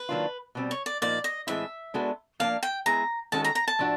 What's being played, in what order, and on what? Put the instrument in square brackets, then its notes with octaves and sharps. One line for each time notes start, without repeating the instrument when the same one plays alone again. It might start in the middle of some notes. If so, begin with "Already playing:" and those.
Already playing: [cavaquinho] B4
[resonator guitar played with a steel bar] D#3 F#3 A#3 D4 F4
B2 G3 C4
[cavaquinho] C#5
D5
[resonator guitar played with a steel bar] A#2 F3 A#3 D#4 [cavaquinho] D5
[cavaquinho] D#5
[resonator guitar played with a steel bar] A2 E3 G#3 C4 E4 [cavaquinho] E5
[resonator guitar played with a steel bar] G#3 B3 D4 F#4 A4
[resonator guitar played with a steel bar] F3 A#3 D4 [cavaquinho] F5
[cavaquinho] G5
[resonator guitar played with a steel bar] G#3 B3 E4 G#4 [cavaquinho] A#5
[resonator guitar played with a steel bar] D#3 G#3 C#4 F#4 A4 [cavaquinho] A5
[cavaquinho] A#5
A#5
A5
[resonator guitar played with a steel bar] A2 F3 A3 D4 F#4